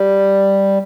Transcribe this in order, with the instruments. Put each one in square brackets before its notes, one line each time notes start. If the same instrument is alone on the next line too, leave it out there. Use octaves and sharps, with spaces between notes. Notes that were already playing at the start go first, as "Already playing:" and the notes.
Already playing: [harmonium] G3